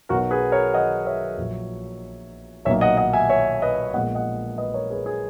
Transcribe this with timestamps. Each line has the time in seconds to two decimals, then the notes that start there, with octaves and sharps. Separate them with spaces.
0.09 B1 B2 F#3 B3 F#4 A#4
0.31 G#4 B4
0.52 A#4 C#5
0.74 D#5 F#5
1.06 C#5 E5
1.38 A#1 A#2 F#3
2.65 B1 A#2 F#3 A#3 C#5 E5
2.81 D#5 F#5
2.97 D#5 F#5
3.13 E5 G#5
3.29 C#5 E5
3.62 B4 D#5
3.93 A#1 A#2 G#3 B3 D#5 F#5
4.15 D#5 F#5
4.58 B4 D#5
4.74 A#4 C#5
4.90 G#4 B4
5.06 G#4